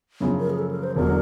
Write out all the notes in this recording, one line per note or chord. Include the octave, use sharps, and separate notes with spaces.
F#2 C#3 F3 A#3
A#4
G#4
A4
A#4
C5
E1 D3 F#3 A#4